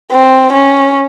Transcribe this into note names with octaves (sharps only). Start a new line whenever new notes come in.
C4
C#4